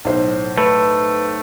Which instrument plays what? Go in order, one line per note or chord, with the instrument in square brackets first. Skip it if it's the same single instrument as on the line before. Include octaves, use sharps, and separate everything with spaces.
[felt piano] B1 A2 C5
[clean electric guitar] A3 [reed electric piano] B4